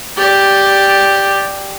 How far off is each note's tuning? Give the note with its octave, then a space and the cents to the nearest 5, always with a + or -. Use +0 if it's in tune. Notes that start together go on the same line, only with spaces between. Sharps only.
G4 +0 D5 +0